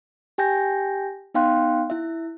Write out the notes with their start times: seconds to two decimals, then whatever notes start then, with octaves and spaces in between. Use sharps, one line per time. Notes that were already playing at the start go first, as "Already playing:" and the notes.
0.38 G4 G5 G#5 G6 A#6
1.34 B3 D#4 F5 G5 C6 F#6
1.90 E4 E5